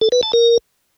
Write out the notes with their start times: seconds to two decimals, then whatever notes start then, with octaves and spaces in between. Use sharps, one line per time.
0.01 A4
0.12 B4
0.23 A5
0.33 A#4